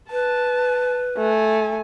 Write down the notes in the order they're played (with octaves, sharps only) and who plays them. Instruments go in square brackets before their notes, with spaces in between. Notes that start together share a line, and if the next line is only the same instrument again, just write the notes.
[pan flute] B4 [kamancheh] A5
[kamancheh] A3 G#5